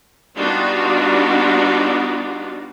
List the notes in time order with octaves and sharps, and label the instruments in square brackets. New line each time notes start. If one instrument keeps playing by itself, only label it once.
[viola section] G3 B3 D4 D#4 F4 F#4